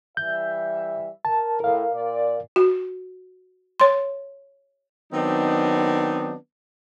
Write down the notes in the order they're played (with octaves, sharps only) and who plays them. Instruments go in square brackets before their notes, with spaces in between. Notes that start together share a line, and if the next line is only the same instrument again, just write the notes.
[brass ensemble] E3 G3 E5 [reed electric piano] G6
[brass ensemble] A#4 [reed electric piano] A5
[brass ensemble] A2 [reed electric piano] A#4 F5
[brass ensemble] A#2 D5
[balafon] F#4
C#5 C6
[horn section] D#3 F#3 B3 C4 D4 D#4